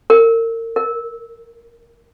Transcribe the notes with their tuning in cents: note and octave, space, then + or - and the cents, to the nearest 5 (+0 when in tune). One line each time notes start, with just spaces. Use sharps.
A#4 -35
A#4 +10